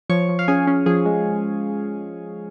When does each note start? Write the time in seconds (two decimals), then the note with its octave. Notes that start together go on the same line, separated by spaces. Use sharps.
0.09 F3 C#5 C#6
0.29 F3
0.39 F5
0.48 C#4 G#4 G#5
0.67 C#4
0.86 F3 G#4
1.06 G#3